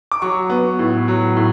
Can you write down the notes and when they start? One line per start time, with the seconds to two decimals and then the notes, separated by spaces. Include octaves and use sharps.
0.12 D6
0.22 F#3 C#6
0.50 B3
0.79 A2
1.08 F#3
1.37 A2